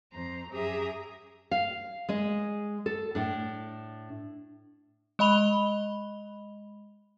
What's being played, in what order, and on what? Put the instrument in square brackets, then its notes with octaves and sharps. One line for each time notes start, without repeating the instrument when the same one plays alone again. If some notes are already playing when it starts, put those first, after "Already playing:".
[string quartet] F2 C5 A#5
F#2 G4 G#4 E5 A#5 D#6
[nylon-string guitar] F5
G#3 D#5
A4
A2 D4
[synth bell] G#3 D#5 B5 F7 G7